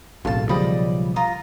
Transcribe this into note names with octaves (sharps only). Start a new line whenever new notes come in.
E1 B1 A2 C4 F4 A5
C#3 F3 G3 D5 D#5 B5
F4 A#5 D#6